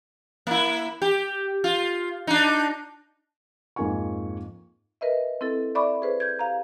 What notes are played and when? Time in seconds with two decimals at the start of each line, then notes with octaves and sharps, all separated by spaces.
0.47 A#3 E4
1.02 G4
1.64 F4
2.27 D4 D#4
3.76 F2 G#2 A#3 F4 G#5 C#6
5.01 A#4 B4 D#5 E5
5.41 C4 E4 A4
5.75 D5 E5 B5 C#6 D6
6.02 G#4 B4 C5
6.20 G6 G#6
6.39 G4 F5 A#5